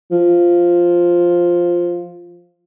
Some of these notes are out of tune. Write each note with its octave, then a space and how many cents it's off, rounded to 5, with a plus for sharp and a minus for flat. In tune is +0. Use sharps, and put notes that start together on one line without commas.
F3 +0